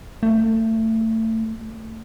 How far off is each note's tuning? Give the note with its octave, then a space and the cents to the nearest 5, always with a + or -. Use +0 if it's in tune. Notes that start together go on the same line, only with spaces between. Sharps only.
A3 +25